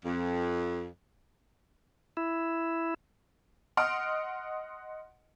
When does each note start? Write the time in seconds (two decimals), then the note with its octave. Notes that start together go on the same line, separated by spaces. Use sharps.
0.04 F2
2.17 E4
3.77 D#5 F#5 C6 D#6 F6 D7